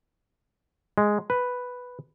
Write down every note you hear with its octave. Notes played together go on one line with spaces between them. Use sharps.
G#3
B4